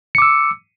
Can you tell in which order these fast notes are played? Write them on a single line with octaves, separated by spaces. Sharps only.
C#7 D6 E6